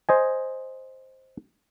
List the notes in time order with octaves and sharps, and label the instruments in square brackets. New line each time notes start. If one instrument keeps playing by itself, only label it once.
[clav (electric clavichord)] C5 D#5 G#5